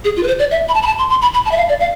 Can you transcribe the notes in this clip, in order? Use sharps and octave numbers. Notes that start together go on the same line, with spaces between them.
G#4
F4
B4
C5
D5
E5
B5
A5
B5
A5
C6
C6
B5
B5
A5
E5
F5
D5
F5